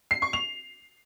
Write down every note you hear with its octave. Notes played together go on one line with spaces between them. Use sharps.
C7
C#6
F7